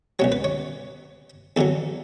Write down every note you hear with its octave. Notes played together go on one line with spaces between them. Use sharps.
C#2 B2 F#3 C#5
B4
C#5
E2 D3 F#3 A4